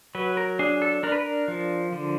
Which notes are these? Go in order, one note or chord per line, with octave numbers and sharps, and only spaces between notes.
F#3 B4
A#4
D4 G#4
A4
D4 A#4
B4
A#4
F3
D3